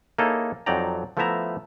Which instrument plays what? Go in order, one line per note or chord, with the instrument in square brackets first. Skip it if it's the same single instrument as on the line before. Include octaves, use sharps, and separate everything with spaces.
[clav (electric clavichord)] A#3 D#4 E4 G#4 A4 C#5
F2 F#3 D#4 D5 G5 A#5
F3 A3 B3 E4 E5 A#5